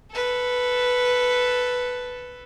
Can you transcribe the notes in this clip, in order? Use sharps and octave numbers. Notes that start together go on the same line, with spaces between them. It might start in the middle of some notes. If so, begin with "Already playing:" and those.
A4 B4